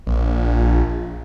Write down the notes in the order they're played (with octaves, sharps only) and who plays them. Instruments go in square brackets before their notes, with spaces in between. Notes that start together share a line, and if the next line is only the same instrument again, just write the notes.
[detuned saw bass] A#1